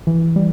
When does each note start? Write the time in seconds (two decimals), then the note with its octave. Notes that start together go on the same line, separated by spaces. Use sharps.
0.07 E3
0.36 G3